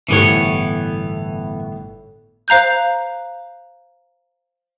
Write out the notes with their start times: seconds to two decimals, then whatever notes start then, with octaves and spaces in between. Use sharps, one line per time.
0.09 G1 A2 E3 B3 A4 C#5
2.48 C5 F5 A#5 F#6 G6